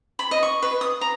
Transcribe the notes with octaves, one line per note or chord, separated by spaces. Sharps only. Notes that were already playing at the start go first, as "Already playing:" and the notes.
B5
D#5
C#6
B4
D#6
A#5